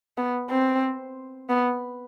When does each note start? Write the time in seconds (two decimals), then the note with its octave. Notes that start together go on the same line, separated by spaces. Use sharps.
0.18 B3
0.50 C4
1.49 B3